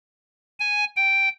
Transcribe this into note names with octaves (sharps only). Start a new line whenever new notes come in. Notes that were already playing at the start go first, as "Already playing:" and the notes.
G#5
G5